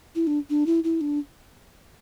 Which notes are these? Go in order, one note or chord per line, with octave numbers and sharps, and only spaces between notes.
E4
D4
D4
E4
E4
D4